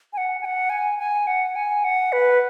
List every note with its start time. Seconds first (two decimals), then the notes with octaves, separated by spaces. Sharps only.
0.13 G#5
0.18 F#5
0.41 G#5
0.45 F#5
0.70 G#5
0.99 G#5
1.27 F#5
1.56 G#5
1.84 F#5
2.12 B4